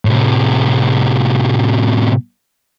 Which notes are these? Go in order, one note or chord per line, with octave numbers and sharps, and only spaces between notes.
A2 C3